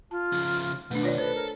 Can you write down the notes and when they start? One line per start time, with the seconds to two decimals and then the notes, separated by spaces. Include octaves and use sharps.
0.11 F4 A5
0.33 C#3 F3
0.91 B2 D#3 A3 D4 B4
1.03 F4 C#5 D5
1.18 A4 B4 C5
1.35 A#4